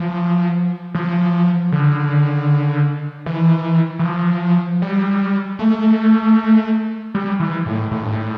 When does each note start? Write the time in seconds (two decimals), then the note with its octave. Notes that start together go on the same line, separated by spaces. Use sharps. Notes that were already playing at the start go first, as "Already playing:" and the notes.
Already playing: F3
0.95 F3
1.72 D3
3.26 E3
3.99 E3
4.04 F3
4.82 G3
5.59 A3
7.15 G3
7.40 E3
7.66 A2
7.91 A2
8.02 G2
8.12 A2